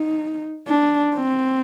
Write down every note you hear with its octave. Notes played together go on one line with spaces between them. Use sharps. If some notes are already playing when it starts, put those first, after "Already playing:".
Already playing: D#4
D4
C4